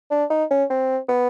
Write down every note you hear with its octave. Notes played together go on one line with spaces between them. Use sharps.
D4
D#4
C#4
C4
B3